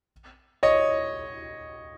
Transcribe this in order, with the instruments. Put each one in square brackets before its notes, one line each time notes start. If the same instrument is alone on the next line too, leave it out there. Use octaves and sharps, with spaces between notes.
[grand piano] C#5 D#5